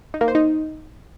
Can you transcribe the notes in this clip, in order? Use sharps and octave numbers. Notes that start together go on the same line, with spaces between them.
D#4
A#3
C5
D#4